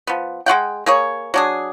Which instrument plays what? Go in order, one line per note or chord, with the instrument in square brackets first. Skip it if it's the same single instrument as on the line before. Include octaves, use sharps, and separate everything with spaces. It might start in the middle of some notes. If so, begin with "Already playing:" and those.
[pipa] F3 B3
G#3 F4 F#5 G5
A#3 G#4 C#5
F#3 D4 G#4